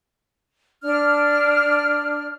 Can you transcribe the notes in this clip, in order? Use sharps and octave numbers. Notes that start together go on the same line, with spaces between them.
D4 F6